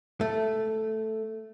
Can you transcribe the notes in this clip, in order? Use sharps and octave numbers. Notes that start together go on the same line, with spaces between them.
A3